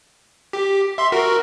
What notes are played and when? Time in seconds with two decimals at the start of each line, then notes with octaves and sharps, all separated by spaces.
0.53 G4
0.98 E5 C6
1.12 F#4 A#4